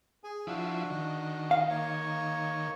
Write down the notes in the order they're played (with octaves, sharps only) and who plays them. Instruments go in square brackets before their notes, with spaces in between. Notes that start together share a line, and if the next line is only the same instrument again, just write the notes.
[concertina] G#4 G#5
[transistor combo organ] F3 E4 [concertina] D4 F#4
[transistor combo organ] D#3
[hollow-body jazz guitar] F5
[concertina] A#3 C#5 C#6